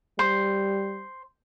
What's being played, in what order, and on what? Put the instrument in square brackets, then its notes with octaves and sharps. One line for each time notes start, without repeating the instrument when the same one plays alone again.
[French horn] G3 [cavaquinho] C5